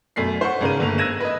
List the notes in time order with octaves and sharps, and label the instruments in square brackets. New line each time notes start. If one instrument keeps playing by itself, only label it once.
[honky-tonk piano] F#2 B2 A3 B6 C7
C5 F#5 C#6
G#1 C#3 A#4 D#7
G1 A3 A#3 F7
E6 F#6 G#6 A#6 D#7 E7
B4 D#5